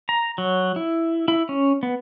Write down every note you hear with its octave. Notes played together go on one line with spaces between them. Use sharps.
A#5
F#3
E4
E4
C#4
B3